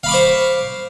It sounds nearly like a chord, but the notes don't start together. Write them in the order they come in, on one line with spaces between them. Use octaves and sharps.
F5 B5 D6 C#6 C5